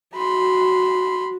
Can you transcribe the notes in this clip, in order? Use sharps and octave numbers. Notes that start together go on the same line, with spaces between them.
F#4 B5 C6